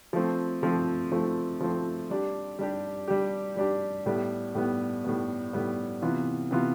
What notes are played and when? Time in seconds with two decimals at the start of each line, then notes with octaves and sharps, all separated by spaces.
0.13 F3 A3 C4
0.63 F3 A3 C4
1.11 F3 A3 C4
1.60 F3 A3 C4
2.10 G3 D4 G4
2.59 G3 D4 G4
3.08 G3 D4 G4
3.57 G3 D4 G4
4.06 A2 G3 B3
4.55 A2 G3 B3
5.04 A2 G3 B3
5.53 A2 G3 B3
6.02 C3 E3 B3 F4
6.51 C3 E3 B3 F4